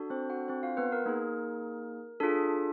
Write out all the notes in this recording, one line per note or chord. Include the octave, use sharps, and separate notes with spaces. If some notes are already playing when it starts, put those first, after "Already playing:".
Already playing: D4 F#4 A4
C4 C5
F#4 F#5
C4 C5
F4 F5
B3 B4
A#4
A#3 D#4 G#4
D4 F4 G#4 A4